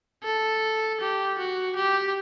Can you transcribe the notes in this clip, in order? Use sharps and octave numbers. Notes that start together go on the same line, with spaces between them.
A4
G4
F#4
G4